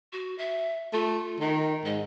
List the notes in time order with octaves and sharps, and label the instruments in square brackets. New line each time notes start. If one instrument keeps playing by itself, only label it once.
[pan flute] F#4
E5
[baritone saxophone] A3 [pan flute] F4
[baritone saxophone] D#3 [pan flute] D#5
[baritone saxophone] G#2 [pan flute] D#5